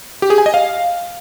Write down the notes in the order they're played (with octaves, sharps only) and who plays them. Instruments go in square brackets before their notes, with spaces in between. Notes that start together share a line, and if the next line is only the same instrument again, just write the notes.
[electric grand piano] G4
G#4
G#5
D#5
F5